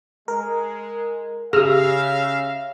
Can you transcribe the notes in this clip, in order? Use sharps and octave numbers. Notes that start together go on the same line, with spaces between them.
G#3 A#4
C#3 G4 G#4 E5 F5 E6 F6 A#6